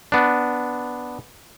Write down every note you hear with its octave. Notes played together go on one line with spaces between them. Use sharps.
B3 D4